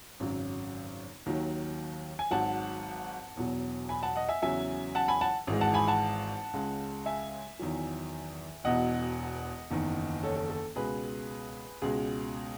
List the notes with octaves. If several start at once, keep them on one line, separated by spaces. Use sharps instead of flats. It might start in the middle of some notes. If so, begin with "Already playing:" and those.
G#1 F#2 C#3 F#3
D#2 D#3 F#3
G#5
G#1 G#2 F#3 F#5 A5
E1 E2 B2 F#3
G#5 B5
F#5 A5
D#5 F#5
E5 G#5
E2 C#3 F#3 E5 G#5
F#5 A5
G#5 B5
F#5 A5
G#1 G#2 E3 G#3
F#5 A5
G#5 B5
F#5 A5
C#2 C#3 G#3
E5 G#5
E2 D#3 F#3
E1 E2 B2 D#5 F#5
F#1 E2 D#3
A4 C#5
A4
A4
C#2 B2 G#3 G#4 B4
C#2 B2 G#3 G#4